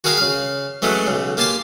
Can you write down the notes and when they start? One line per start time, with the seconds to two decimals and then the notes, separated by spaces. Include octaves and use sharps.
0.04 F#4 G#4 A#4 F5 G5 B5
0.17 C#3 F5
0.82 E3 F#3 G#3 A3 C#4
1.07 B1 C#3
1.37 A#3 G4 G#5 A5 C6 D6